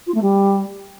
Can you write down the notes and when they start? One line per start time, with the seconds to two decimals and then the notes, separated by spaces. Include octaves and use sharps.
0.07 F4
0.14 A3
0.22 G3